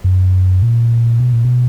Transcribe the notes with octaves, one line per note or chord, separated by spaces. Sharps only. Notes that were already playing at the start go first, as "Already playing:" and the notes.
F#2
A#2
B2
A#2
B2